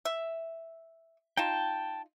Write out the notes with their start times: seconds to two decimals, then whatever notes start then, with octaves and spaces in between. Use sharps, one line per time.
0.05 E5
1.37 D#4 F4 G5 A5